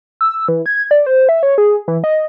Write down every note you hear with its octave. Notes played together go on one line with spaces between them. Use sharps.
E6
E3
G#6
D5
C5
E5
C#5
G#4
E3
D#5